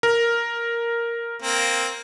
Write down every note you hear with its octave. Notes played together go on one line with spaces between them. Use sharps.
A#4
A#3 C4